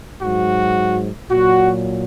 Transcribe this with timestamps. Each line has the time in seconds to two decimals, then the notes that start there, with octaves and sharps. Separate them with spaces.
0.22 G#2 F#3 F#4
1.31 A#2 F#3 F#4